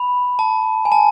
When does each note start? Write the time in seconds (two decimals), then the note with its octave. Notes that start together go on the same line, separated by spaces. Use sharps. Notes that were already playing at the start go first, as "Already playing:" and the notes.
Already playing: B5
0.39 A5
0.85 G#5
0.92 A5